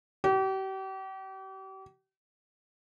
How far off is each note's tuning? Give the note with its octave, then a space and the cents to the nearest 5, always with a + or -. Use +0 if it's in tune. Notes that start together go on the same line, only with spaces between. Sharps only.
G4 -40